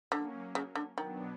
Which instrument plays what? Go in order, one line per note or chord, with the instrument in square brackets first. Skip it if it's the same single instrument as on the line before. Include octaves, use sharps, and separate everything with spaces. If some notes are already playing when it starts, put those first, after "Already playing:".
[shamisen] D3 [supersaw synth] F#3 A#3 C#4
[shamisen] C#3
D3
[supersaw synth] B2 F#3 B3 D4 [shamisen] D#3